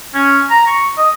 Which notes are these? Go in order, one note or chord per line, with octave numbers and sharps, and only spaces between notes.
C#4
A#5
C#6
D#5